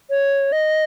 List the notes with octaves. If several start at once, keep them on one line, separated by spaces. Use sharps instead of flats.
C#5
D#5